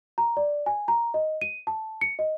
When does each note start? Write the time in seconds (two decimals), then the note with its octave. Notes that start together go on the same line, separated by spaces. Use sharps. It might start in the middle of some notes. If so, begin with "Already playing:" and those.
0.18 A#5
0.37 D5
0.66 G#5
0.88 A#5
1.14 D#5
1.42 D#7
1.67 A5
2.01 C#7
2.19 D#5